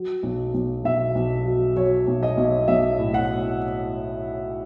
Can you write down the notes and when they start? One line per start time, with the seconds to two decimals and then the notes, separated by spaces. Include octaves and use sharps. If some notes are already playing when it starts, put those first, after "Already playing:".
Already playing: F#3
0.23 B1
0.54 B1
0.84 B1 E5
1.15 B1
1.45 F#3
1.76 F#3 C#5
2.07 B1
2.23 D#5
2.37 B1
2.68 B1 E5
2.99 A2
3.14 F#5